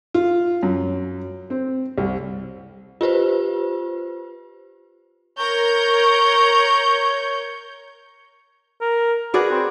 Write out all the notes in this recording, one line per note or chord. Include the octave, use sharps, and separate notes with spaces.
F4
F#2
C4
C2
F4 G4 B4 C5
A#4 C#5 G6
A#4
F#4 G#4 B4 D5
C4